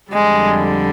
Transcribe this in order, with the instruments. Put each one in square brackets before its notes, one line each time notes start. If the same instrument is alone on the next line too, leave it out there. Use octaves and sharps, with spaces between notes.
[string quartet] F2 D3 G3 G#3